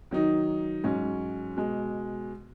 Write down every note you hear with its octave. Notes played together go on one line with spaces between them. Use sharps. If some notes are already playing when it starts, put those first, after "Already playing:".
D#3 F#3 D#4
G#2 F#3 C#4
B2 G#3